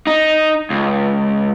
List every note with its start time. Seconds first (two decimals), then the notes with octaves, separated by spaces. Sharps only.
0.07 D#4
0.70 C#2